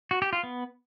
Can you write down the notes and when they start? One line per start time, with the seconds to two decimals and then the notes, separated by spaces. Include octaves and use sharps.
0.11 F#4
0.22 G4
0.33 F4
0.43 B3